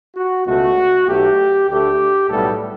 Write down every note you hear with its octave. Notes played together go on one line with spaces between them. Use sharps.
F#4
C#2 B2 A3 F#4
B1 B2 A3 G4
D2 D3 A3 G4
B1 A2 G3 B3 A4